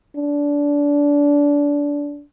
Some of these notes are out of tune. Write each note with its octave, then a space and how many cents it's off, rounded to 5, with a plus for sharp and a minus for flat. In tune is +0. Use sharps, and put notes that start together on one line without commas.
D4 -25